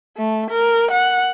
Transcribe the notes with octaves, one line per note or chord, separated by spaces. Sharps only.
A3
A#4
F#5